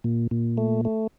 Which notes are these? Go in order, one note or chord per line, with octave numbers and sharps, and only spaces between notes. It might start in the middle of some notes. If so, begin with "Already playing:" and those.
A#2
A#2
A3
A3